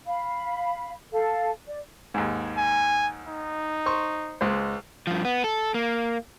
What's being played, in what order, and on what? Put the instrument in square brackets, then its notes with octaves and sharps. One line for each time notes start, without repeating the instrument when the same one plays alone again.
[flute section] F5 B5
A4 F5
D5
[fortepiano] D#2 G#2
[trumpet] G#5
D#4
[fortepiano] C5 C6 C#6
C#2 G#3 C5
[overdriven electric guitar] G2 F3
B3
A4
A#3